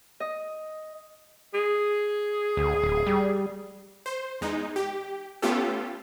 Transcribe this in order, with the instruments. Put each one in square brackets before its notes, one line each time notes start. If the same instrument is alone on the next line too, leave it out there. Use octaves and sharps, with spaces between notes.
[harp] D#5
[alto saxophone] G#4
[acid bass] D2
D1
G3
[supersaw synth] C5
E2 G#3 D#4
G4
A3 B3 C#4 F4 G4 A4